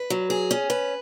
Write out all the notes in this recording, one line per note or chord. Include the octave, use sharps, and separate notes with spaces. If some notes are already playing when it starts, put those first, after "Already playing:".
Already playing: B4
F#3
G#4
C#4
B4